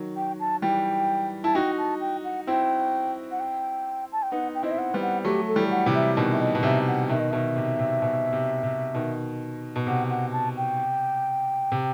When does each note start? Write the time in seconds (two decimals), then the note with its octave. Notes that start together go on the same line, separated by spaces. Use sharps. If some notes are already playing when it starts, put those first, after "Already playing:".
Already playing: D#3 F#3
0.16 G5
0.40 A5
0.62 E3 G3 G5
1.44 E4 A5
1.55 D#4 F#4 G5
1.78 A5
2.01 G5
2.24 F#5
2.47 C4 E4 G5
3.31 F#5
3.40 G5
4.12 A5
4.23 G5
4.32 B3 D#4 F#5
4.55 G5
4.63 C4 E4 D#5
4.71 E5
4.78 F#5
4.94 G3 B3
5.02 F#5
5.25 F#3 A3 G4
5.48 A4
5.56 E3 G3
5.71 F#5
5.86 C3 E3
5.95 E5
6.17 B2 D#3
6.32 E5
6.41 D#5
6.55 B2
6.63 C3 E5
6.87 F#5
7.09 B2 D#3 E5
7.20 D#5
7.31 B2 D#3 E5
7.56 C3
7.79 C3
8.02 B2
8.33 C3
8.63 C3
8.94 B2 D#3
9.76 B2
9.87 C3 F#5
10.10 F#5
10.33 A5
10.57 G5
11.72 C3